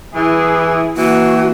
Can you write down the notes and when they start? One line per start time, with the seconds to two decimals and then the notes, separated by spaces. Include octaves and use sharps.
0.15 E3 E4 G#4
0.97 E3 A#3 F#4